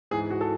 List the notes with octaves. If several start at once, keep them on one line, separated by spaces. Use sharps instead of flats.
G#2 E3 G#4
F#4
A4